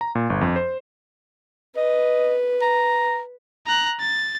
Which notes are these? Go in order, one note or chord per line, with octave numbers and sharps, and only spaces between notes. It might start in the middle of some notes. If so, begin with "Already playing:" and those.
A#5
A#2
G1
F2
C5
B4 D#5
A#5
A#5 F#6
A6